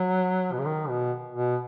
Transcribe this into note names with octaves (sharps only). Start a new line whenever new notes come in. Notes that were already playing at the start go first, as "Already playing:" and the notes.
Already playing: F#3
B2
C#3
D#3
B2
B2